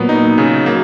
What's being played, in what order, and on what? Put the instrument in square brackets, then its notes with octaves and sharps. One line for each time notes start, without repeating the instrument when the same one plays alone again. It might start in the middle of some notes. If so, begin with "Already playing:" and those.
Already playing: [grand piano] A#2 [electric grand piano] F#3 B3
[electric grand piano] D#4
C#3
[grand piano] F#3 [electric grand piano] A#3